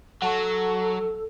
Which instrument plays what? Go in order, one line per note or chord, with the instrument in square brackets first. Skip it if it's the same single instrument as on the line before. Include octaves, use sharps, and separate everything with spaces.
[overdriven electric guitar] F#3 [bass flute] A4 [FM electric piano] F#5 A5 C#6